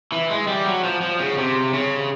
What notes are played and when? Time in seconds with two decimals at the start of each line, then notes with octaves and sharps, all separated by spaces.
0.12 E3
0.30 G#3
0.47 G3
0.66 F#3
0.84 F3
1.02 F3
1.20 C#3
1.38 C3
1.74 C#3